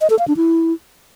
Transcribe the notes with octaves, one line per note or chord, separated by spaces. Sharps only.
D#5
A4
F5
D4
E4